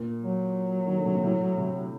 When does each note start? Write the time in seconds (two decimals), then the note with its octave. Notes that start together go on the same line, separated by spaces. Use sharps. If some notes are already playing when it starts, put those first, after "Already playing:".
Already playing: A#2
0.22 F#3
0.86 D#3
0.96 D3
1.05 C3
1.14 A#2
1.23 A2
1.57 C3